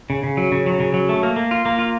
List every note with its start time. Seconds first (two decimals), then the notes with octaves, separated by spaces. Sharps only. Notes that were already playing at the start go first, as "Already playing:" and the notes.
0.10 C#3
0.24 C#3
0.37 F#3
0.52 C#3
0.66 F#3
0.80 C#3
0.94 F#3
1.09 A3
1.23 A#3
1.36 A#3
1.51 F4
1.66 A#3
1.79 F4